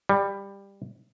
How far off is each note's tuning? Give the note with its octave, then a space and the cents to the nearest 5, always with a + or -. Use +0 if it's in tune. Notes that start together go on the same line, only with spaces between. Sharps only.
G3 +15